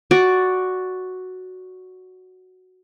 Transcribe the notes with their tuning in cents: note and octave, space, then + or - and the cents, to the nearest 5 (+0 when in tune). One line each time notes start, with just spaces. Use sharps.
F#4 +0 D5 +0